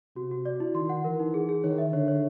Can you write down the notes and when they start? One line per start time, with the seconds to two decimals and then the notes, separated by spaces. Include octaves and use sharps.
0.16 C3 F#4
0.31 F#4
0.46 D5
0.60 E4
0.75 D#3 C6
0.89 F#5
1.04 E3 A#4
1.20 D#4
1.34 G#4
1.49 G#4
1.64 D#3 C#5
1.78 E5
1.93 D3 C#5
2.08 C#5